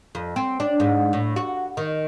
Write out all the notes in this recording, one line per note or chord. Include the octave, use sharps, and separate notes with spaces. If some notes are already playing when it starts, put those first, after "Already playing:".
F2
C4
D4
G#2
A2
F#4
D#3